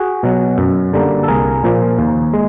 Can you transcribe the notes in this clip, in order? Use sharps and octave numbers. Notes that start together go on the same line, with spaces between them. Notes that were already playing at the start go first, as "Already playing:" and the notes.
Already playing: F#4 G#4
B2 F#3
F#2
D3 G3 A#3
A4
C2 G#4 A#4
A#2 F3 A#3
D#2
G#3